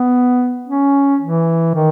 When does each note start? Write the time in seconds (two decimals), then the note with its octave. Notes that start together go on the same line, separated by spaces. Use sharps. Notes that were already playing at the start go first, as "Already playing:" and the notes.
Already playing: B3
0.67 C#4
1.21 E3
1.75 D#3